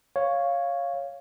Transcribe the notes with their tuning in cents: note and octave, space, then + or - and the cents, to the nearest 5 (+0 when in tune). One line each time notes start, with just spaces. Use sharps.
C#5 +0 F5 +0